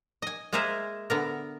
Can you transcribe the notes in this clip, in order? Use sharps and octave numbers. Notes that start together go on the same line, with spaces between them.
D#5 G#5
G#3 A#3 G#4 A#4 C5 E5
D3 B3 A#4